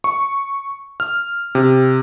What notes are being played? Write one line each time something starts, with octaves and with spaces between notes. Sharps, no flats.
C#6
F6
C3